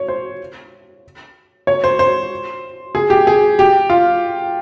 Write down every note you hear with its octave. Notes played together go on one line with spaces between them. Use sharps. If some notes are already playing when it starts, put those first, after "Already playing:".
Already playing: C#5
C5
C#5
C5
C5
G#4
G4
G#4
G4
F4